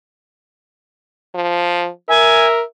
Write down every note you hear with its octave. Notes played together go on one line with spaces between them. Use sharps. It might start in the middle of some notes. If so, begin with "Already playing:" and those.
F3
A#4 E5 G#5